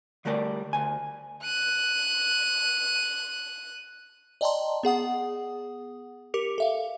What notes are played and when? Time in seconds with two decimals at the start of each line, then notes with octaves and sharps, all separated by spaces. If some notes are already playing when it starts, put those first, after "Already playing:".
0.25 D3 G3 A3 A#4 D5
0.73 D2 G#5
1.43 F#6 D#7
4.41 D5 D#5 G5 A5 A#5 C6
4.83 B3 G#4 F#5 D#6
6.34 G4 A#4 D6 C#7 F7
6.58 A4 E5 F5